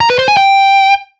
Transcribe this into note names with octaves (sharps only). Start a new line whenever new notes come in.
A#5
B4
C5
G#5
G5